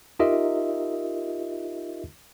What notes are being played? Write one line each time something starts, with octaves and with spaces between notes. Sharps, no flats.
D#4 F4 G4 A#4 D#5 E5